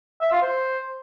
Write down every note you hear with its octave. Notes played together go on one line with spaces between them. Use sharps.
E5
F4
C5